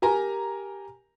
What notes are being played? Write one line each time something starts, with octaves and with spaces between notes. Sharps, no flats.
G4 A#4 G#5 A#5